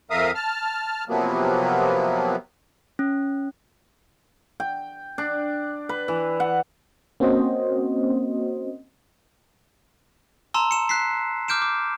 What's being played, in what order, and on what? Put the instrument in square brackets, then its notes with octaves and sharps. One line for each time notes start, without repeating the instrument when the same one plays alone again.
[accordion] F2 A#4 E5 F5 D#6
A5 F6
C3 F3 F#3 A#3 B3
[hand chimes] C#4
[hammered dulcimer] G5
D4
B4
E3
F#5
[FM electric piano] A#3 C4 C#4 F#4 C5 D#5
[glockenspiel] A5 A#5 C6 E6
C#7 E7
F#6 B6 C7
D6 F6 G6 D7 E7
D6